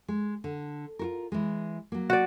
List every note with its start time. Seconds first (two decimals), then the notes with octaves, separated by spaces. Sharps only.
0.08 G#3
0.44 D3
0.99 F4 F#4 A#4
1.32 E3 G#3
1.92 F#3 A#3
2.10 F#4 D5